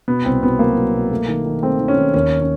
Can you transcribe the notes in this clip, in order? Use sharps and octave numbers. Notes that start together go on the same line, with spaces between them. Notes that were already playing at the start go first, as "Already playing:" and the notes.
B2 B3
C2 C4
B2 B3
F#3 A#3
F#3
B2
A3
D#3
D#3
A3 C4
D#3
C#4
D#3
D#2 C#4
C#4